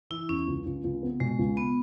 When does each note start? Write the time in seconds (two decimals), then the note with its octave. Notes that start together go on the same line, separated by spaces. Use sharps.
0.10 E3 E4
0.29 E2 C#4
0.48 C#2
0.66 C#2
0.84 C#2
1.03 B3
1.20 B2 G#3
1.39 C#2
1.57 B3